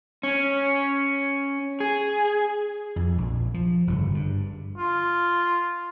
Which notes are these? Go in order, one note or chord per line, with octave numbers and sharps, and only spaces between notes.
C#4
G#4
F2
A#1
F3
G1 F2 C#3
G2
F4